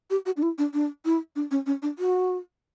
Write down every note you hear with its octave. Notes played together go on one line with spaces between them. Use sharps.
G4
F#4
D4
E4
D4
D4
E4
D4
C#4
C#4
D4
F#4